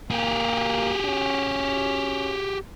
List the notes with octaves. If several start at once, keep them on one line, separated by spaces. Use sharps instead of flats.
A#3 G4 G#4
C#4